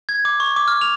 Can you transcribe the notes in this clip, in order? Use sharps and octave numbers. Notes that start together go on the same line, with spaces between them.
G#6
D6
C#6
D6
F6
F7